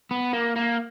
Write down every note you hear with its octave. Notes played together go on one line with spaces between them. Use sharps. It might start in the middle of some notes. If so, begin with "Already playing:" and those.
B3
A#3
A#3